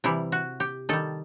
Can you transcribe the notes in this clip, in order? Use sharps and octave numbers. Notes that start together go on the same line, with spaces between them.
C3 E3 G3 E4
F#4
G4
D#3 G3 A4